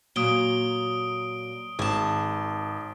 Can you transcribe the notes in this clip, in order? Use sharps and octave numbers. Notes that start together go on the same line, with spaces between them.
A#2 F#3 D#6 D7 G7
G#1 G#4 A5